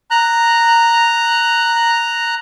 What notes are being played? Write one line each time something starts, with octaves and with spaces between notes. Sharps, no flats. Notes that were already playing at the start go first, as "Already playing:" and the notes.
A#5 F#6